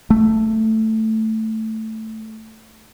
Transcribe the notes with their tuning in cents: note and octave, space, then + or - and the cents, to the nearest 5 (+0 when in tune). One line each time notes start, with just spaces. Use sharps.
A3 +5